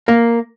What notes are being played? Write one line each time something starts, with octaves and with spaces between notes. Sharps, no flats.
A#3